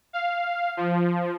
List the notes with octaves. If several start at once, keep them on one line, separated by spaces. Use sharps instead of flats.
F5
F3